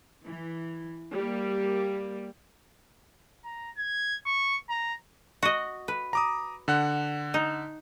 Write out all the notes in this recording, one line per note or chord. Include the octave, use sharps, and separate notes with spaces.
E3
G3 A#3
A#5
G#6
C#6
A#5
F#4 D#5
B4
A#5 D6 D#6
D3 F#5 F#6
D#4